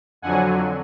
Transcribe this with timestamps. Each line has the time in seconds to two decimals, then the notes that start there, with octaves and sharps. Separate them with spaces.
0.22 F2 D3 F#3 F#5 G#5